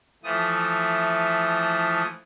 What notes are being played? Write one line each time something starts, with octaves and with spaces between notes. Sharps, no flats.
E3 F3 A3 D#6